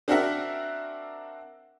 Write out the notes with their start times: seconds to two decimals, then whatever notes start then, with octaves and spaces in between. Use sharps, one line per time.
0.08 C4 D4 F#4 A#4 E5 F#5